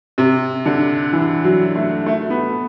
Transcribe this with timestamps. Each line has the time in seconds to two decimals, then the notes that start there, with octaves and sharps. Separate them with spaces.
0.18 C3
0.65 D3
1.13 E3
1.44 F#3
1.75 A3
2.06 A3
2.30 B3